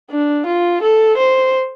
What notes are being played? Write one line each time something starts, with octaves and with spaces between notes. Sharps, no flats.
D4
F4
A4
C5